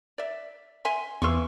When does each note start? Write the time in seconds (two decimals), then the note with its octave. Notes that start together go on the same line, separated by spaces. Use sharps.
0.18 D5 E5
0.85 E5 G#5 C6
1.22 E2 E3 F3 C6 C#6 E6